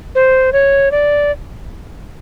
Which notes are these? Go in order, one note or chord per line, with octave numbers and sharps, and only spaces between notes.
C5
C#5
D5